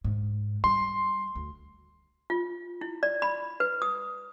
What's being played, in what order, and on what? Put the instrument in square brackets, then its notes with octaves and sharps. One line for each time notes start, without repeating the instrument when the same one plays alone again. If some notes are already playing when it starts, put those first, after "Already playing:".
[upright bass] G#2
[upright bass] G3 [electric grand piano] C6
[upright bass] D2
[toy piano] F4
E4
D5
B5
B4
D#6